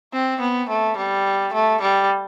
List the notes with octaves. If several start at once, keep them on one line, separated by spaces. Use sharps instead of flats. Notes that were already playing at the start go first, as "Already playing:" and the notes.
C4
B3
A3
G3
A3
G3